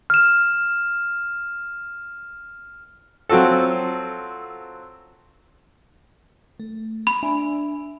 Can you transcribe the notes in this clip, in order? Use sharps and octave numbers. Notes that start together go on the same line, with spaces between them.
F6 E7
F#3 C4 F4 F#4 A4
A3
B5
D4 E5 G#5